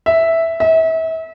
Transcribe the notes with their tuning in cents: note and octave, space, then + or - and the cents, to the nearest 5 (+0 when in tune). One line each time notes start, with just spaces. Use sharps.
E5 -5
E5 -35